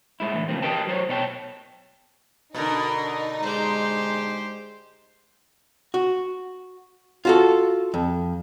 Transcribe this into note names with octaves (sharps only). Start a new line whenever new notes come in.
A2 G#3 E4
A2 D3 E3
C#3 F3 A#3 C4
G4 A#4 B4 D#5 G5 A5
F#3 C5 C#5
B2 C#5 G5 A5
B2 D3 D#4 A#4
G#3 G4 C5
F#4
F4 F#4 A4
F2